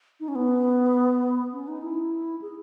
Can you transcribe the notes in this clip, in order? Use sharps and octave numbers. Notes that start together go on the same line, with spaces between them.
D#4
C#4
B3
C#4
D#4
E4
G#4